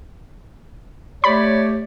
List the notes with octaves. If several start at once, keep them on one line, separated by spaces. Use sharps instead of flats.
A3 G4 C#5 D5 B5